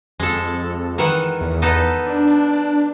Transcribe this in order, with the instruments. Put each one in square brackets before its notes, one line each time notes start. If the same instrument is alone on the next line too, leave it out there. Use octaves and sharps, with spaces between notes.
[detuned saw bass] F2 [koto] G#3 A4
[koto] D#3 E3 F#5
[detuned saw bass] E2
[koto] B3 D#4 A4
[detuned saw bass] D4